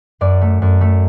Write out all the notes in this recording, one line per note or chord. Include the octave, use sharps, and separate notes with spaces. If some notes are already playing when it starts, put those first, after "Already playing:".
F#2 D5
A3
F#2
A3